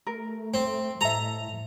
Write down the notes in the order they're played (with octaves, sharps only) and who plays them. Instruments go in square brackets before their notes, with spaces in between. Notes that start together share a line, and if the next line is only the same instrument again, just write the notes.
[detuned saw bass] A3 [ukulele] A#4
[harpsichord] C4
[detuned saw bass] A2 [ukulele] A4 E5 [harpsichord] A#5